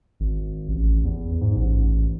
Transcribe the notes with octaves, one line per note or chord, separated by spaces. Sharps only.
G#1
A1
E2
G#2
A1